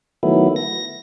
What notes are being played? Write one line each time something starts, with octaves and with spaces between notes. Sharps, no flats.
D#3 F#3 A3 B3 E4
A#6